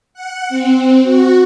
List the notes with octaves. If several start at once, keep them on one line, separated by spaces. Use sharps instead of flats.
F#5
C4
F#4